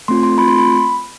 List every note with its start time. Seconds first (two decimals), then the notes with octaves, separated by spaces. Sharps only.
0.08 A3 C4 F4 C6
0.23 C6
0.38 A3 C4 F4 B5
0.48 C6
0.59 B5